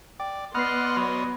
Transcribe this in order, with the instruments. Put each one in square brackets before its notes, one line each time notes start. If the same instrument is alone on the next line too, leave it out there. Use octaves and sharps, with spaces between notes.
[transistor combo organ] D5 [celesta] G5
[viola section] B3 D5 C6 [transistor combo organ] D#5 F#5 F6 [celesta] B5 C7
[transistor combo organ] F#3 D#5 [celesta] B5